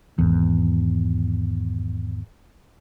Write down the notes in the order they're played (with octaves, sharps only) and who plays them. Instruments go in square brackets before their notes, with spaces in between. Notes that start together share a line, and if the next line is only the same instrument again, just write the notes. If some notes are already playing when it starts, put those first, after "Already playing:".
[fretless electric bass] G#1 E2